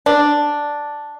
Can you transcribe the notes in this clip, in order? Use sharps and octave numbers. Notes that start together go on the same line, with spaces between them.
D4